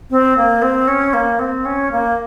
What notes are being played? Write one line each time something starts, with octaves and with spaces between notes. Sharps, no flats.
C4
A#3
C4
C#4
A#3
C4
C#4
A#3